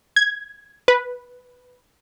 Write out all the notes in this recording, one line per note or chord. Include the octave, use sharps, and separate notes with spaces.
G#6
B4